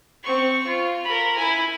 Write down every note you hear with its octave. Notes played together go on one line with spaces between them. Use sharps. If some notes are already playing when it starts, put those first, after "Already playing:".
C4 C#6
F4
A#4 B5
E4 G#5